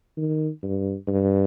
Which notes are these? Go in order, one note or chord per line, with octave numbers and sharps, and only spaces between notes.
D#3
G2
G2